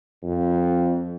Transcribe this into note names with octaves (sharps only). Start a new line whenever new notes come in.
F2